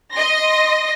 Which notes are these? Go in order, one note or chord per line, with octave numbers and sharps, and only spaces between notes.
D#5 C6 A#6